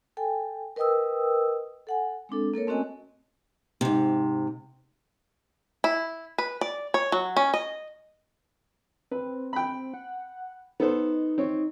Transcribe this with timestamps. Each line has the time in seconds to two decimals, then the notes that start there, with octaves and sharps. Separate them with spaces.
0.17 A4 G5 G#5
0.76 A#4 B4 D#5 G5 D#6 E6
1.87 A4 F#5 G#5
2.29 G#3 C4 D4 A4
2.54 A#3 A4 A#4 C#5
2.67 A3 C4 C#4 F#4 D#5 G#5
3.81 G#2 C3
5.84 E4
6.38 B4
6.61 D5
6.94 C#5
7.12 F#3
7.36 C#4
7.54 D#5
9.11 C4 B4
9.53 G5 B5
9.94 F#5
10.80 B3 D#4 A4 C5
11.38 C4 C#5